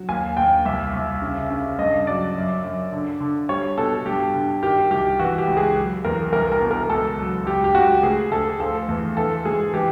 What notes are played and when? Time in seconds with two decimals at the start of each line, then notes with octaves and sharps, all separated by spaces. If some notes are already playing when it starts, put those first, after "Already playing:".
Already playing: F#3
0.09 D#2 G#5
0.37 D#2 G5
0.65 C2 E5
0.94 C2
1.22 C#3
1.50 C#3
1.79 G2 D#5
2.07 F#3 D5
2.36 F#2
2.64 F#2
2.92 D3
3.20 D3
3.49 G3 C#5
3.77 B2 A4
4.05 G2 G4
4.34 D3
4.63 D#3 G4
4.91 C2 G4
5.19 E3 F#4
5.38 G4
5.48 C#2
5.57 G#4
5.76 F#3
6.05 E2 A#4
6.33 C2 A#4
6.52 A#4
6.61 B2
6.71 A#4
6.89 C#2 A4
7.18 F#3
7.46 C#2 G4
7.64 G4
7.74 C#2 F#4
8.03 D2 G#4
8.32 D2 A4
8.60 F3 A4
8.89 E2
9.17 E3 A4
9.45 G#2 G#4
9.74 E3 G4